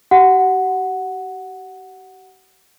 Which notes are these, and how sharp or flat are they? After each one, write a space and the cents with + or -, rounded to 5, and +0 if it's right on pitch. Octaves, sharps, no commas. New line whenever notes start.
G4 -40 F#5 +0